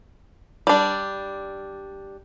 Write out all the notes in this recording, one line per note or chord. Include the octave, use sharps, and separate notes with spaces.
G3 D4